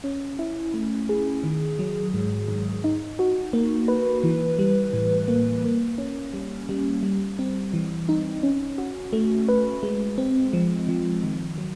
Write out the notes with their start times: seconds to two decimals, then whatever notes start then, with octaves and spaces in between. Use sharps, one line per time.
0.04 C#4
0.39 E4
0.74 A3
1.09 G#4
1.43 D#3
1.79 F#3
2.14 G#2
2.48 G#2
2.84 D#4
3.19 F#4
3.53 A#3
3.88 B4
4.23 E3
4.59 G3
4.93 A2
5.28 A#3
5.64 A#3
5.98 C#4
6.34 G3
6.69 G3
7.03 G3
7.39 C4
7.73 E3
8.09 D#4
8.43 C#4
8.78 F#4
9.13 A3
9.48 B4
9.83 G#3
10.18 C4
10.53 F3
10.89 F3
11.23 D#3
11.58 F#3